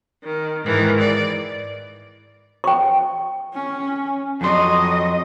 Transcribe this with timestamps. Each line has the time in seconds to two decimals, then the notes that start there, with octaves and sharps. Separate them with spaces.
0.23 D#3
0.64 G#2 D#3 E3
1.00 D5
2.64 G5 C#6
3.54 C#4
4.41 F2 F#3 D#5 C6